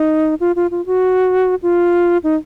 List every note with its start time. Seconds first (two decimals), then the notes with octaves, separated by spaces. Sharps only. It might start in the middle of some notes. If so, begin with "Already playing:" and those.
Already playing: D#4
0.40 F4
0.56 F4
0.71 F4
0.86 F#4
1.63 F4
2.24 D#4